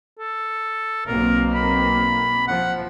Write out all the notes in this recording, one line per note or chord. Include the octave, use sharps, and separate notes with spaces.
A4
B1 A#3 C4 A#4
B5
F3 F#5